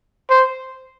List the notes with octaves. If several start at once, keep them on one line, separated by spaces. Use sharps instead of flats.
C5